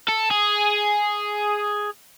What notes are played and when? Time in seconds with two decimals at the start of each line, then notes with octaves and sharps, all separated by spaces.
0.09 A4
0.31 G#4